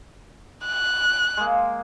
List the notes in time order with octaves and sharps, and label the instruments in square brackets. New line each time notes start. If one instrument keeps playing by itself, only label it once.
[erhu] F#6
[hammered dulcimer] G#3 A#3